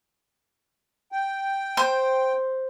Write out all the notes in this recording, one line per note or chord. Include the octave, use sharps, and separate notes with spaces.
G5
C5